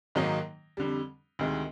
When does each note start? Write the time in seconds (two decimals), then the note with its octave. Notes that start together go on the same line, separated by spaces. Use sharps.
0.15 G#2 D#3 F#3 A#3 D#4
0.77 F2 D3 G3
1.39 D2 C3 D#3 G#3